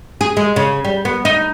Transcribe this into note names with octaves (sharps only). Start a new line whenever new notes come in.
G#4
G#3
C#3
G3
B3
D#4